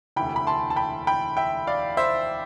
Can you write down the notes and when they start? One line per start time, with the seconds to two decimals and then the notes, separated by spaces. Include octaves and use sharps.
0.16 E1 D2 C3 E3 A3 G5 B5
0.36 B5
0.47 A5 C6
0.70 A5
0.76 G5 B5
1.07 G5 B5
1.37 E5 G5
1.67 D5 F5
1.97 C5 E5